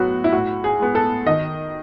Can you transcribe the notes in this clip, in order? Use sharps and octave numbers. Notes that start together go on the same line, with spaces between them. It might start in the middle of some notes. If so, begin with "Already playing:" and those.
Already playing: A2 F#3 B3 F#4
E4
A2 F#4
G#4
G#3 B3
A4
D#3 D#5